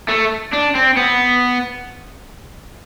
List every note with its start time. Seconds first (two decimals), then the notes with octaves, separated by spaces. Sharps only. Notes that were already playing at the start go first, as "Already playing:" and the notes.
0.09 A3
0.53 D4
0.75 C4
0.96 B3